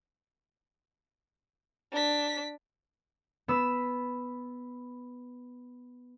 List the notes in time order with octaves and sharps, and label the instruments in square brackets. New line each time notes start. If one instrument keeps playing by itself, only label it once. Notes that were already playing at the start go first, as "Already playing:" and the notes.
[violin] D4 B6
[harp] B3 B5 E6